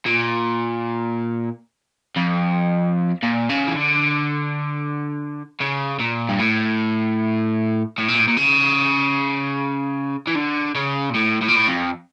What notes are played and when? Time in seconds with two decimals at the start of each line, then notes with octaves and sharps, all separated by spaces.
0.06 A#2
2.17 F2
3.23 A#2
3.49 C#3
3.67 E3
3.76 D3
5.61 C#3
6.00 A#2
6.29 G2
6.39 A2
7.98 A2
8.08 A#2
8.19 A2
8.28 A#2
8.37 C#3
10.28 E3
10.36 D3
10.75 C#3
11.10 A#2
11.14 A2
11.42 A2
11.48 A#2
11.56 A2
11.67 F2